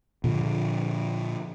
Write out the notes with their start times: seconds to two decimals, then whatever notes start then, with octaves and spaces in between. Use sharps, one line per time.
0.24 A#2 D3 F3